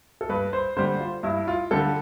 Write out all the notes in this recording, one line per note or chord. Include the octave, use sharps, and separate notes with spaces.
A4
G2 B4
C5
D3 G3 C5
F4
G2 E4
F4
D3 G3 A4